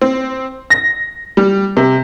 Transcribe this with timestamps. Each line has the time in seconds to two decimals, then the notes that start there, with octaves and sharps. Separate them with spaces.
0.01 C4
0.70 A#6
1.37 G3
1.77 C3